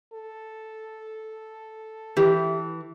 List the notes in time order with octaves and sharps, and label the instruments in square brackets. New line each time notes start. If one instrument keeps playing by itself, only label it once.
[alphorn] A4
[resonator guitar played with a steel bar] E3 [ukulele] G4